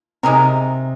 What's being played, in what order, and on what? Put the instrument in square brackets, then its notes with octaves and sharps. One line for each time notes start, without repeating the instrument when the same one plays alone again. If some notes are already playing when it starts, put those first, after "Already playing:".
[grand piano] C3 [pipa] G#3 D#4 G4 A#4